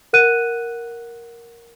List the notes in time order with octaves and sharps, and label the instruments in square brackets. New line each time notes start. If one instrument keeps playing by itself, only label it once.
[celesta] A#4 F#5 F#6 D#7